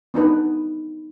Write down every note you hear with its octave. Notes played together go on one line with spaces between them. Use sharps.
B3 D4 D#4 B4